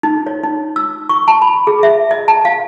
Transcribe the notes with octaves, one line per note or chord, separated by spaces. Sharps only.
D#4
C#5
D#4
E6
C#6
A5
B5
G#4
E5
D#5
A5
F5